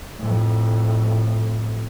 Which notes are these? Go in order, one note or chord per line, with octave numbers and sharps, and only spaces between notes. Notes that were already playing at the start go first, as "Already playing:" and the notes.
F2 A2